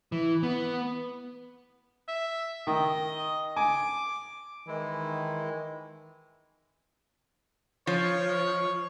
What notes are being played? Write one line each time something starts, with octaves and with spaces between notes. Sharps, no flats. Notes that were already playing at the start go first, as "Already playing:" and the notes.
E3
B3
E5
D#3 D#5
G#5 D6
D#3 E3 G#3 E4
F3 C#5